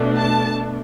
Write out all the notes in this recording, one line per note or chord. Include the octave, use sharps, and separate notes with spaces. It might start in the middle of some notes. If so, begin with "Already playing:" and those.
Already playing: B2 A3 D4
A5